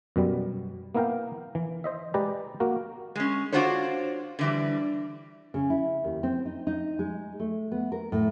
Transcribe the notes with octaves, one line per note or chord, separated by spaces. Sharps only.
F#2 B2 G3
A#3 B3 E4 A#4 F5 G5
E3
C5 D#5 E5
G#3 G4 B4 D5 A#5
A#3 F#4 A#4
G#3 C#4
D4 F4 F#4 A4 C5 C#5
D3 E3 G3
C#3
E4
D#2
C4
D#4
D#4
G#3
A3
B3
A#4
A2